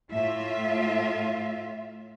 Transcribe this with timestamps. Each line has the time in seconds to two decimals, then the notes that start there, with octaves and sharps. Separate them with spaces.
0.11 A2 F4 E5